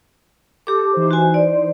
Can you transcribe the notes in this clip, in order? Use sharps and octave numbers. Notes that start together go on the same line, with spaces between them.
G4 A4 D6
E3 D#4 C5
F#4 G#5
D5